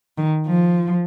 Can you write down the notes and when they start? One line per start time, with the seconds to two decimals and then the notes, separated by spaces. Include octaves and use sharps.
0.18 D#3
0.47 F3